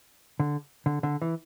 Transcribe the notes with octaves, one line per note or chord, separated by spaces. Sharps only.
D3
D3
D3
E3